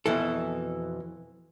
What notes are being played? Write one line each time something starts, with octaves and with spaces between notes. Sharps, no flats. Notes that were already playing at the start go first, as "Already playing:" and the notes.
F2 B2 E3 A4